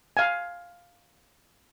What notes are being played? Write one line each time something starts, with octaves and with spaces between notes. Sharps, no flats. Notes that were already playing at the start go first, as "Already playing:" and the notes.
F5 G#5